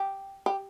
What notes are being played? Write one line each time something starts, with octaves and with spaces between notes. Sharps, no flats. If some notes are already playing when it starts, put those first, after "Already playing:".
Already playing: G4
G4